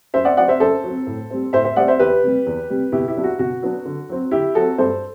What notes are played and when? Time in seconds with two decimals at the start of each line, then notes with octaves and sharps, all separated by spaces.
0.14 F#2 C5 E5
0.25 D5 F#5
0.37 F#3 C4 D5 F#5
0.48 C5 E5
0.60 F#2 A4 C5
0.84 F#3 C4
1.07 A2
1.31 G3 C4
1.53 A2 C5 E5
1.64 C5 E5
1.76 G3 C4 D5 F#5
1.88 C5 E5
1.99 E2 G4 B4
2.23 C3 G3
2.46 E2
2.70 C3 G3
2.92 B2 E4 G4
3.07 E4 G4
3.15 F#3 B3 D4
3.24 F#4
3.39 B2 F#4
3.62 F#3 B3 D4
3.85 D3
4.09 F#3 C4
4.31 D3 E4 G4
4.55 F#3 C4 F#4 A4
4.78 G2 A4 C5